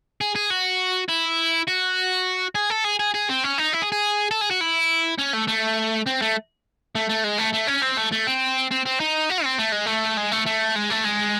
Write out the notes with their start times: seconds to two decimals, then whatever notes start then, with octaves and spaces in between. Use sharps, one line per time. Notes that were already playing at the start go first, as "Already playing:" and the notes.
0.21 G#4
0.36 G#4
0.50 F#4
1.09 E4
1.67 F#4
2.55 G#4
2.70 A4
2.85 G#4
2.99 G#4
3.14 G#4
3.29 C4
3.44 C#4
3.58 D#4
3.73 E4
3.82 G#4
3.92 G#4
4.31 A4
4.41 G#4
4.51 F#4
4.61 E4
5.19 C#4
5.34 A3
5.48 A3
6.07 C4
6.22 A3
6.95 A3
7.10 A3
7.24 G#3
7.39 A3
7.54 A3
7.68 C#4
7.83 C4
7.98 A3
8.12 A3
8.27 C4
8.71 C4
8.85 C4
9.00 D#4
9.30 F#4
9.44 C4
9.59 A3
9.72 G#3
9.86 A3
10.17 G#3
10.32 A3
10.46 A3
10.76 G#3
10.91 A3
11.05 G#3